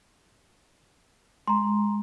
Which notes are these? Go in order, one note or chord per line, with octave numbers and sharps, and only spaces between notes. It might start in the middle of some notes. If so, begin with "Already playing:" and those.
G#3 A#5 C6